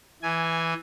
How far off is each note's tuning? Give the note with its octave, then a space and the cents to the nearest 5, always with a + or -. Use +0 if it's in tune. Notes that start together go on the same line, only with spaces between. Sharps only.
E3 +0 G#5 +0